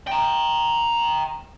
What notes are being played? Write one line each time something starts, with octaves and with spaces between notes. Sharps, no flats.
G5 A#5